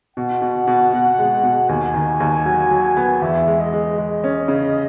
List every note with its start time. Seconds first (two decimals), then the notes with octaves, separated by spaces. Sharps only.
0.16 B2 F#5
0.42 B2
0.67 B2
0.93 B2
1.19 G#3
1.43 B2
1.69 D#2 G#5
1.94 D#3
2.20 D#2
2.45 F#3
2.71 F#3
2.97 B3
3.22 E2 E5
3.47 G#3
3.60 D#5
3.73 G#3
3.98 G#3 D#5
4.24 C#4
4.48 C#3